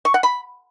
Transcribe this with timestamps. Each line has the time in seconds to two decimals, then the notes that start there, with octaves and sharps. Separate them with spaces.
0.05 C#6
0.14 F#5
0.23 B5